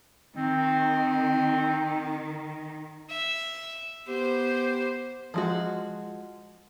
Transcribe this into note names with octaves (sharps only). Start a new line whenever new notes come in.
D#3 C4
E5
B3 G4 C5
F3 G#3 F#4